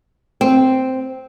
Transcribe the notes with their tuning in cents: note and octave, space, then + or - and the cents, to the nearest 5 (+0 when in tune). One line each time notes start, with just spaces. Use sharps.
C4 -5